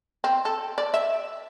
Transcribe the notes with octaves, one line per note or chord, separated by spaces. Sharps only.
C4
A4
D5
E5